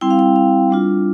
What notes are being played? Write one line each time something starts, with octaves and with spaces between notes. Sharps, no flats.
G3 C4 E4 G5
F5
G5
F5
G3 D4 F4